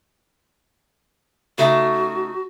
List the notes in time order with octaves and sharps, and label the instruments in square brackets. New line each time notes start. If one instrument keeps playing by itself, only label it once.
[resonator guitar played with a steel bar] C#3 A3 D#4 [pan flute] F#4